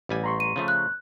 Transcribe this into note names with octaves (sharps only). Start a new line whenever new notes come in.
A1 G3 G#5
A#5 C6 C#6
D#7
C#3 F3 A3
F#6